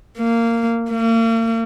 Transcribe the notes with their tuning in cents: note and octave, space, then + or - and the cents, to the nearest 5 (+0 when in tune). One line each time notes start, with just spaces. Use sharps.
A#3 -15
A#3 -40